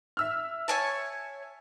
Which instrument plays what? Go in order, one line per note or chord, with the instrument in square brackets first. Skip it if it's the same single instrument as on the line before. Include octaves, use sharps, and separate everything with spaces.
[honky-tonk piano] E5 E6 F6
[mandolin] C#5 G#5 A5